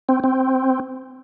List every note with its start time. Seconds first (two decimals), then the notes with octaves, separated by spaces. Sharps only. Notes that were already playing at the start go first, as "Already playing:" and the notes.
0.09 C4
0.24 C4